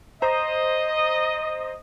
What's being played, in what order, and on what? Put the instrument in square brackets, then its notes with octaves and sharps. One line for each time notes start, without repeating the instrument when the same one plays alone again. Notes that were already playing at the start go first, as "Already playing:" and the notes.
[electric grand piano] C5 A#5 [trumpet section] D#5